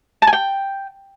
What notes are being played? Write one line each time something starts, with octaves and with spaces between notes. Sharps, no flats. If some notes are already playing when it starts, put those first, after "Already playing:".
A5
G#5
G5